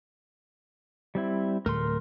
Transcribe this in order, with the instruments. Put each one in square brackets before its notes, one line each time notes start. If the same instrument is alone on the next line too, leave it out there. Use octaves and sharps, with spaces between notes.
[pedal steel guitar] G3 C4 E4
[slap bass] D1 A3 [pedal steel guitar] A#4 C6